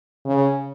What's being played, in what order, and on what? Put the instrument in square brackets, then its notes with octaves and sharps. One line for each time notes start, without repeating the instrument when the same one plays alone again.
[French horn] C#3